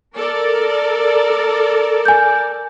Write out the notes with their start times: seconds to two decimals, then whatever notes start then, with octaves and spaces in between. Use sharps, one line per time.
0.15 A4 A#4 D5
2.05 G#5 G6